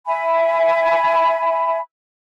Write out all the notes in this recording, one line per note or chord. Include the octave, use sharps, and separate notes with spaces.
E5 G#5 B5